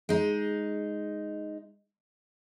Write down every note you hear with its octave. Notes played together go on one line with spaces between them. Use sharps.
G#3 D#4